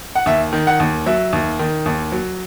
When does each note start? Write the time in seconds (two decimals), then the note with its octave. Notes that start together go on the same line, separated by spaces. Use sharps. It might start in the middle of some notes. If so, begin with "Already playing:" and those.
0.15 F#5
0.26 D#2 E5
0.53 D#3
0.67 F#5
0.80 D#2
1.06 F#3 E5
1.33 D#2
1.59 D#3
1.86 D#2
2.12 F#3